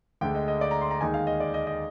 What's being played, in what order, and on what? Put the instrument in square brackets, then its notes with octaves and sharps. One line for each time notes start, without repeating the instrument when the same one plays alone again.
[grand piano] D2 D3 G#3 G5
D#5
D#5
D5
A#5
C6
A#5
D#2 D#3 G#3 D#4 G#5
F5
D#5
D5
D#5
D#5